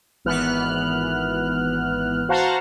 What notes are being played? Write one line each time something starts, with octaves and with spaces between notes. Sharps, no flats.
G#1 E3 B3 F6 F#6
F#4 C5 F5 F#5 A5 A#5